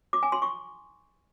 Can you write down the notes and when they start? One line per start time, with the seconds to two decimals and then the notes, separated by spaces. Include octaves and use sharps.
0.13 D6
0.23 G#5
0.32 C6
0.42 C#6